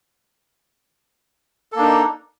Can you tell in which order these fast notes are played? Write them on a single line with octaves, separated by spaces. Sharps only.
A4 A#3 D4 D#4